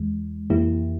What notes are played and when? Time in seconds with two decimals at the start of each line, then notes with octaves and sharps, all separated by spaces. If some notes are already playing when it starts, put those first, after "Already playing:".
Already playing: E2 E3 G#3
0.50 F2 E3 A#3 E4 G4